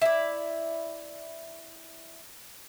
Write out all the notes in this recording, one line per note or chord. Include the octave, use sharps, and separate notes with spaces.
E4 D5